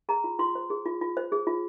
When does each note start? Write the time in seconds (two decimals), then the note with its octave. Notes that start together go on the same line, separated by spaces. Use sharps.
0.09 G#4 A#5
0.24 F4
0.39 F4 C6
0.55 C5
0.70 G#4
0.86 F4
1.01 F4
1.17 C5
1.32 G#4
1.47 F4